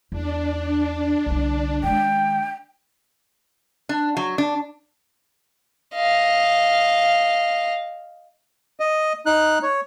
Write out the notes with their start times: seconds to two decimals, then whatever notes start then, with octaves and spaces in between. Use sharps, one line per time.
0.12 E2 D4
1.26 C2 D3
1.83 D#3 G#3 G5
3.89 D4
4.17 F#3
4.38 D4
5.95 D#5 F5
8.80 D#5
9.26 D#4 F#6
9.63 C#5